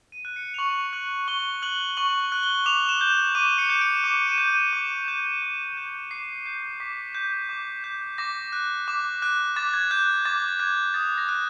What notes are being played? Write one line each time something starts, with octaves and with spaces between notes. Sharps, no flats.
D#7
F#6
C#7
F7
C#6 F#7
F#6 F#7
C#6 G7
F#6 F#7
C#6 F#7
F#7
F#6
G7
D6 F7
E7
G6
D6 D#7
C#7
G6
D7
D6 E7
D#7
G6
D#7
D6
G6
D6 D7
G6
D6 C7
G6 C7
D6 B6
G6
D6
G6
D6 A#6
F#6
D6
F#6
D6 A6
G#6
F#6 G6
D6 A6
A6
F#6 G#6
D#6 A6
A#6
F#6